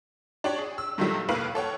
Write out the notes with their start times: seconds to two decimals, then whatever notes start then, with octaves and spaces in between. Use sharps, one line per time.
0.44 D4 G4 C#5 D5
0.59 G#4
0.78 E6
0.98 G2 A#2 D#3 F#3 G3 A3
1.28 F1 A2 A#3 B4 F5 F#7
1.55 A4 C#5 F#5 G5